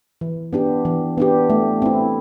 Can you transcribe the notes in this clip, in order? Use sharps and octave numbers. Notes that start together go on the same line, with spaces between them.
E3
B3 D4 G4
E3
B3 D4 G4
A3
C4 E4